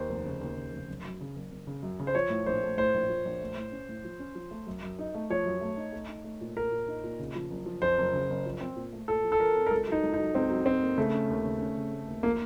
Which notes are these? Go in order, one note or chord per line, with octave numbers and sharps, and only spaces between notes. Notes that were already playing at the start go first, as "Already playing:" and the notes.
Already playing: D#2 C5
F1
C#3
D#2
C#3
F1
F#1
F#2
C#3
F#1
F#1
C#3
F#2
C#3
C5
F3 C#5
A2
A#1 C5
A3
A2 C5
A#1
F3
A#1
A3
A2
C#4
A2
F3
C#4
F3
A3
F#2
F#2
D#4
A3
F3 C#5
F#2
A3
D#4
A3
D#4
A3
A#2
A#2 A#4
A#2
D#4
A#2
C#3
F3
F#1
F3
F2 C5
F#1
C#3
F#1
F3
C4
A#2
A3
A#2 A4
F3
A4
F3 A#4
C4
A#4
C#2 A4
F#3 D#4
C#2
D#4
F#3
C#2 C4
F#3
F#3 C4
A#3
C#3 A3
C#4
D#2
C#3
C#4
C#3
A3
D#2
F3 A#3